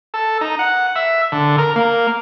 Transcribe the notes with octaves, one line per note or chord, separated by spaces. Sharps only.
A4
D#4
F#5
E5
D3
A#4
A#3